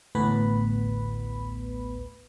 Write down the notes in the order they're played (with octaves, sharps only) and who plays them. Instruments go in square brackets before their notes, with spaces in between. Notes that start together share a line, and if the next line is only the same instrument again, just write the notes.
[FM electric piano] A1 D2 A2 B3 B4 B5